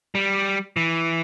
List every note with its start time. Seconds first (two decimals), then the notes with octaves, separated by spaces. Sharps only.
0.15 G3
0.77 E3